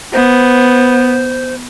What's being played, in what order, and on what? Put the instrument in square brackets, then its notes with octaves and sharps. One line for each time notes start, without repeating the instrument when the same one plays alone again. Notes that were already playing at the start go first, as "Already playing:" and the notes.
[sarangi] B3 [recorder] C5